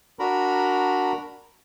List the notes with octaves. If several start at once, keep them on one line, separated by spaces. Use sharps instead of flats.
D4 F#4 A#4 A#5 B5